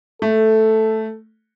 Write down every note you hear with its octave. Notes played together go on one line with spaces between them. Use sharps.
A3 A4